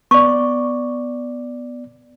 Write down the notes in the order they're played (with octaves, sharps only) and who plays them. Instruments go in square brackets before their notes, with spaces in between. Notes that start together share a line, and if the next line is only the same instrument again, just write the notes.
[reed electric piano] B3 D5 [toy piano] C#6